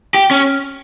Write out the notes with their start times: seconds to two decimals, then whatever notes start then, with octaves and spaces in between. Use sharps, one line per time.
0.14 G4
0.31 C#4